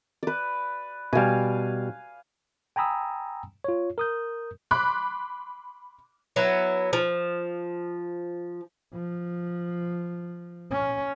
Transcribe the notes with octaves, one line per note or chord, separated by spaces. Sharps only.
B4 D5
B2 G3 F5 G#5
G5 G#5 A#5 B5 D#6 E6
F4 C#5
A#4 D#6 G6
B5 C6 D6 F#6
F#3 B3 E4
F3
F3
C#4